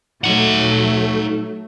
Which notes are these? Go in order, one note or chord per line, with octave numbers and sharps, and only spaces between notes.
F#3 A3 D#4 F#5